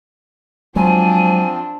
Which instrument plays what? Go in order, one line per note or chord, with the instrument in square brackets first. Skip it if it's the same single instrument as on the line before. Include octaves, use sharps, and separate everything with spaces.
[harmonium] F3 C4 F4 [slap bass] F#3 G#3 [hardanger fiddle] D4 C5 [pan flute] G#5